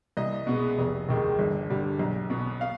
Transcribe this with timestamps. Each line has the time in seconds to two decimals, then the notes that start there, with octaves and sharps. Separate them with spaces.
0.17 C2 D#5
0.47 B2 G#3 B3
0.78 F1
1.09 D#2 D#3 G#3
1.39 G1
1.70 G2 D3 G3
1.99 B1
2.30 B2 B3
2.61 F5